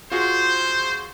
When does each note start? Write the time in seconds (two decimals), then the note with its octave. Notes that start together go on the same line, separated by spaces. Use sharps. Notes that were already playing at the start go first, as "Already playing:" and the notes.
0.12 F4 F#4 G#4 C5